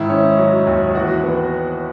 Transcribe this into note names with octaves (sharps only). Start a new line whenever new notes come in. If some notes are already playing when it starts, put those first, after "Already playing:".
Already playing: G#2 D#3 E4
C#4
F#3
D#2
E3 F#4
B3